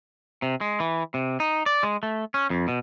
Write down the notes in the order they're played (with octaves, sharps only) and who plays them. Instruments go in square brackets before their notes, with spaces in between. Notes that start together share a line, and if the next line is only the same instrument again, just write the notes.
[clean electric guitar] C3
G#3
E3
C3
D#4
D5
G#3
A3
C#4
F2
B2